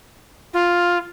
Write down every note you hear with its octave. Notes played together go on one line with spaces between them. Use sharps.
F4